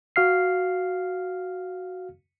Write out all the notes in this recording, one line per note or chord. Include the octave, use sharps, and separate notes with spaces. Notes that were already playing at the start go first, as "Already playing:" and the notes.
F#4 F5 F6 C7